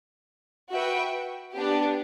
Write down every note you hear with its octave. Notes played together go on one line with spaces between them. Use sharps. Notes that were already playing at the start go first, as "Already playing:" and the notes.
F#4 B4 E5 G5
B3 D4 G4